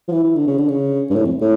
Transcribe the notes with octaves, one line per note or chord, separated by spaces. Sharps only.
F3
E3
E3
D3
C#3
D3
C#3
G2
A2
F2
A2